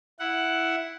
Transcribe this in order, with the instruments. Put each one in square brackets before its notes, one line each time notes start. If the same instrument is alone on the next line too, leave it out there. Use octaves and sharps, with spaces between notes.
[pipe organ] E4 F#5